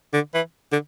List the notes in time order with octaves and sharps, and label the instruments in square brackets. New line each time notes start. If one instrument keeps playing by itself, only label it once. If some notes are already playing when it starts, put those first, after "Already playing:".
[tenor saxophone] D3
E3
D3